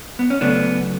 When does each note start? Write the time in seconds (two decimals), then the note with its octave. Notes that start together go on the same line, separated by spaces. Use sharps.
0.19 B3
0.30 C#4
0.41 C#3 F#3 A3 B3 D4